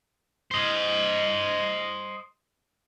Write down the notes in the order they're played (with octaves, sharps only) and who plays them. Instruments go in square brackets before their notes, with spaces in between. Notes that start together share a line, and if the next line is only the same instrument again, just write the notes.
[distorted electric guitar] C5 D#5